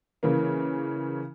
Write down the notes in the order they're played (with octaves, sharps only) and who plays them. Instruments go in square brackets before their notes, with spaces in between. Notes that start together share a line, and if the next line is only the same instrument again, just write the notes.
[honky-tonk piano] C#3 E3 A#3